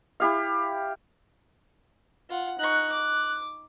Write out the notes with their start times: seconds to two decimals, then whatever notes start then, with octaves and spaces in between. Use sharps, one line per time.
0.20 E4 G4 F5
2.30 F4 F#5
2.59 D#4 C#6 F#6
2.92 D6